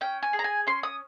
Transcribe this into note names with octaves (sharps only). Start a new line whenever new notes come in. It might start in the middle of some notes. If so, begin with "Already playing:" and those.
C#4 G5
G#5
G#4
A#5
G#5
C#4 C6
D#6